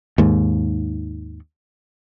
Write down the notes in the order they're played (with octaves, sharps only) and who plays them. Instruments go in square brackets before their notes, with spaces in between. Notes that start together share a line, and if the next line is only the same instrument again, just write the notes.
[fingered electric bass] D#2 G#2